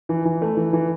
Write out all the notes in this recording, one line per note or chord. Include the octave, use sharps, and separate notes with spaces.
E3
E3
A3
E3
E3